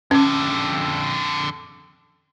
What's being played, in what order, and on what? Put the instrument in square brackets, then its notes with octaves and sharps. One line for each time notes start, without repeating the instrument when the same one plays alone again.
[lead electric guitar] F2 D3 [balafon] C#4